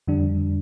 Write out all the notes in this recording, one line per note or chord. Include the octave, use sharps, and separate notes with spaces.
F2 D3 G3 D4